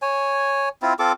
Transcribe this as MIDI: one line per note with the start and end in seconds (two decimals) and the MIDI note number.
0.02 0.69 73
0.02 0.69 80
0.82 0.94 60
0.82 0.94 64
0.82 0.94 65
0.99 1.12 60
0.99 1.12 65
0.99 1.12 69
0.99 1.12 86